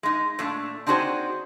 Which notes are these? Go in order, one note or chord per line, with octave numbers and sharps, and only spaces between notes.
G#3 D#4
A#2 A3 D4
C4 D4 D#4 F#4 G#4 C5